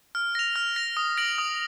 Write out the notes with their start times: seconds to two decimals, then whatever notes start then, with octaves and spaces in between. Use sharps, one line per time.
0.15 F6
0.35 A#6 F7
0.56 F6
0.76 A#6 F7
0.97 D#6
1.17 A#6 D7 F#7
1.38 D#6